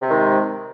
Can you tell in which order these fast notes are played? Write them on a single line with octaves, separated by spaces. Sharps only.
C3 G#3 D#3